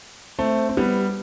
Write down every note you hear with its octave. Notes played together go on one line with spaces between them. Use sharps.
A3 C4
C4
G3 B3